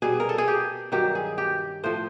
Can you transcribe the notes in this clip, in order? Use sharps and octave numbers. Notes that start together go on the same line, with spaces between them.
B2 G3 G#4
A#4
A4
G#4
G4
G2 D#3 F#3 G4
G#4
G4
A2 F3 C5